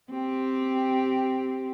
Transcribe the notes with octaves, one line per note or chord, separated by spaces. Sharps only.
C4 G4